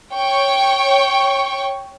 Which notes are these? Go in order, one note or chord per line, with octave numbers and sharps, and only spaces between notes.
C#5 G5 C#6